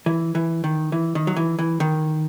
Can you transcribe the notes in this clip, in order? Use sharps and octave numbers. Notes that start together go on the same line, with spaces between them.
E3
E3
D#3
E3
D#3
F#3
E3
E3
D#3